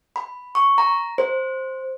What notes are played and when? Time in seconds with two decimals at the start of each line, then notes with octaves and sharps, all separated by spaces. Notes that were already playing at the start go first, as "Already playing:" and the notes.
0.16 B5
0.55 C#6
0.78 A#5
1.18 C5